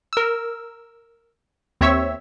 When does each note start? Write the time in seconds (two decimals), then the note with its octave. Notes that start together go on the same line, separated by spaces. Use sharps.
0.13 A#4 E6
1.81 D#2 C4 C#5 E5 C#6 E6